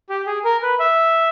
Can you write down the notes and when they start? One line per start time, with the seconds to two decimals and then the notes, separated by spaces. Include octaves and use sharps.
0.10 G4
0.27 G#4
0.45 A#4
0.62 B4
0.80 E5